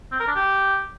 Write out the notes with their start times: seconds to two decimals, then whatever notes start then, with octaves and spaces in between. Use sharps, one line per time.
0.12 C4
0.20 A#4
0.27 D4
0.35 G4